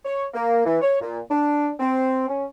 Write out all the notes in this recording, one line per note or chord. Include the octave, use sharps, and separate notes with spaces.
C#5
A#3
E3
C#5
A#2
D4
C4
C#4